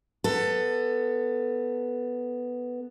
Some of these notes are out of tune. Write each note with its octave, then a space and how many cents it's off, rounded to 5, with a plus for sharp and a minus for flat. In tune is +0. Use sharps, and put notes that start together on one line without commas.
B3 +0 A4 +15